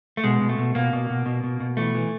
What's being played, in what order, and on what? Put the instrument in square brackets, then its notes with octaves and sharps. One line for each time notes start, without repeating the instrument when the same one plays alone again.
[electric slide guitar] A3
B2 G#3
B2
A3
B2
B2 A#3
B2
B2
B2
B2
B2
E3 A3
E3